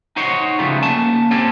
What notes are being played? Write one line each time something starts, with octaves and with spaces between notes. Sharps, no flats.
D#4 F#4 C5 C#5
C#3 F3 G3 A3 B3
A#3 C#4 A5
A#3 C4 C#4 G4 A4